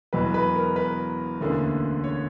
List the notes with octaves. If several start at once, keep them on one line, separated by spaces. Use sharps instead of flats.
E1 E2 B2 F#3 B4
B4
A#4
B4
E1 D2 D3 A#3 C#4
C#5